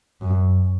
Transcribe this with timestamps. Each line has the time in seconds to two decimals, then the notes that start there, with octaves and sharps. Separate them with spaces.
0.21 F#2